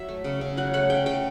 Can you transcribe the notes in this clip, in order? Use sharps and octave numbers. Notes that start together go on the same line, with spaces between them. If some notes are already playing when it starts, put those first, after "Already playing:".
Already playing: F#3 E5
A3
C#3
C#3
F#3 F#5
A3 F#5
C#3 G5
C#3 G5